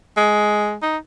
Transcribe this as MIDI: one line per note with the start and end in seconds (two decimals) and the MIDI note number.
0.17 0.76 56
0.83 0.98 63